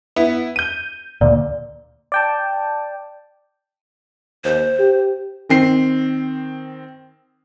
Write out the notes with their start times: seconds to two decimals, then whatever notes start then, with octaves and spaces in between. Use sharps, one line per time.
0.16 B3 E4
0.56 G6 D#7
1.21 D2 A#2 D5
2.12 D5 G5 A5
4.44 D#2 C5
4.79 G4
5.49 D#3 C4 C7